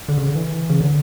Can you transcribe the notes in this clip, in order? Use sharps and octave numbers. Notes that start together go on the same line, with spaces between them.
D3
C#3
D3
E3
C#3
D3